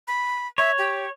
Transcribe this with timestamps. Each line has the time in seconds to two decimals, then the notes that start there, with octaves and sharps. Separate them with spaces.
0.08 B5
0.58 C#5 E5
0.78 G4